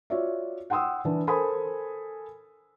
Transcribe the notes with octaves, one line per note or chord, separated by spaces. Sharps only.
F4 F#4 C#5 D5 E5
F#5 G5 C6 D#6 E6
E3 D4 B4
A4 A#4 C5 G#5 B5 D#6